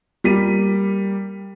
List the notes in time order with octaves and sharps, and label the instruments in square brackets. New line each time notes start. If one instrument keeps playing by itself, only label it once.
[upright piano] G3 A#3 B6 D#7